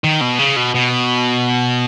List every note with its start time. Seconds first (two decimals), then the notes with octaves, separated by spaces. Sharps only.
0.04 D#3
0.21 B2
0.39 C#3
0.56 B2
0.75 B2